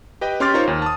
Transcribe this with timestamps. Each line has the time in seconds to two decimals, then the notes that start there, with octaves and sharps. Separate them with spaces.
0.21 G4 B4 D#5 G5
0.40 C#4 G4 C6 D6 F6 A6
0.54 D#4 F4 A#4 C5 C#5
0.67 D#2
0.82 A5 D#6